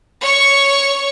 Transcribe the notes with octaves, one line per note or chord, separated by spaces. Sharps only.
C#5 C#6